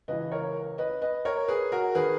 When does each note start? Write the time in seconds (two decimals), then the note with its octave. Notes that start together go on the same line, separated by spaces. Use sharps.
0.08 C#2 C#3 E3 B4 D#5
0.32 A#4 C#5
0.78 B4 D#5
1.01 B4 D#5
1.25 A#4 C#5
1.48 G#4 B4
1.72 F#4 A#4
1.95 D#3 G#4 B4